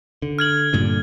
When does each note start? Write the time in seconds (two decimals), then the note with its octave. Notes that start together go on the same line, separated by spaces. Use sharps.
0.22 D3
0.39 F6 G#6 F#7
0.73 G2 A#2 D3